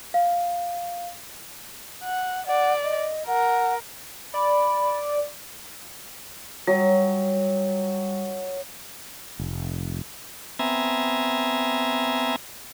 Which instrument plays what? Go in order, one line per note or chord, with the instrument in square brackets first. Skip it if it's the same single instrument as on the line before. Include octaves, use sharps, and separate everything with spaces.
[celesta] F5
[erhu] F#5
[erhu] D5 [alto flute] F#5
[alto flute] D#5
[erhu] A#4 [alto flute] F#5
[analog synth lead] D5 [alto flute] B5
[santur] F#3 D#6 [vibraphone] G3
[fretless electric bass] F1
[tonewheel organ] B3 C4 E5 G#5 A#5